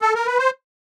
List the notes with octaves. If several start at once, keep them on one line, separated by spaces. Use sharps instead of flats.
A4
A#4
B4
C5